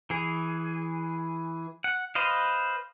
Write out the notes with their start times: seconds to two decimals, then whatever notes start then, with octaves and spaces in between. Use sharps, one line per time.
0.10 E3 G#4
1.84 F#5
2.15 B4 C5 D#5 F5